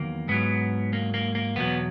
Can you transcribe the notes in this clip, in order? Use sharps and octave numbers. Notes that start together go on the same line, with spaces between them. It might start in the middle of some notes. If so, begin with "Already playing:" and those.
Already playing: E2 D#3 F#3 A#3
G#2 F#3 B3
A#3
A#3
A#3
E2 B2 F#3 B3